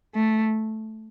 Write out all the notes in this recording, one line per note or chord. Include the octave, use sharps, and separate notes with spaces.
A3